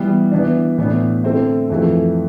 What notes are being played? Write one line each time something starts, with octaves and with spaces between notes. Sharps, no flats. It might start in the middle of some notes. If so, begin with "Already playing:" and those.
Already playing: E3 G3 B3
E3 B3 D4
A2 E3 B3 D4
D3 A3 C4 E4
F2 E3 A3